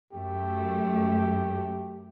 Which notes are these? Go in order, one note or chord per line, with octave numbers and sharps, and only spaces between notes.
F#2 A3 G4